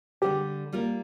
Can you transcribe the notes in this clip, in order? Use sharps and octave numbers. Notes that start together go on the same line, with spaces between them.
D3 G3 D4 G4
G3 A#3 F4 A#4